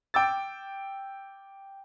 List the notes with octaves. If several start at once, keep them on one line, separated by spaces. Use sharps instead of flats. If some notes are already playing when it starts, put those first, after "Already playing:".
G5 D6 E6 A6